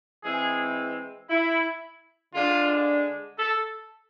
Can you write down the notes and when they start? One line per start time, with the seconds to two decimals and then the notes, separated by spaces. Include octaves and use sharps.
0.24 E3 G#3 C4 G#4
1.29 E4
2.34 D3 G#3 D4 F4
3.39 A4